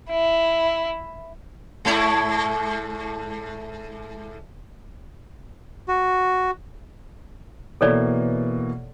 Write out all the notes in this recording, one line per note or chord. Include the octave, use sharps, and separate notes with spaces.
E4
G#2 A3 E4
F#4
B2 E3 A#3 A4 C#5 D5